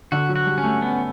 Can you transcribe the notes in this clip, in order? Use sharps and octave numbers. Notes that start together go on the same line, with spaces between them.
D3 F#4
F#3
F#4
G3
C#4
A3
B3